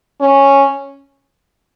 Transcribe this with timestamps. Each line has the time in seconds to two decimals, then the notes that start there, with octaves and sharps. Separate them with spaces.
0.21 C#4